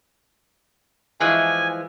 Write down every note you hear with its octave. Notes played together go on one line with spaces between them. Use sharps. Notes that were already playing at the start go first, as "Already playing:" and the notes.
E3 F3 G#3 G#5